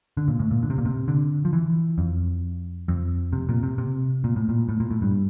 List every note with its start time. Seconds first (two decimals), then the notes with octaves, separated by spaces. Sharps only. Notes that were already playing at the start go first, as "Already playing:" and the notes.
0.17 D3
0.28 A#2
0.39 A2
0.51 A#2
0.63 D3
0.70 C3
0.78 A#2
0.85 C3
1.08 D3
1.45 F3
1.53 E3
1.98 F2
2.88 F2
3.33 C3
3.49 A#2
3.63 C3
3.78 C3
4.24 A#2
4.36 A2
4.49 A#2
4.69 A2
4.80 A#2
4.91 A2
5.02 G2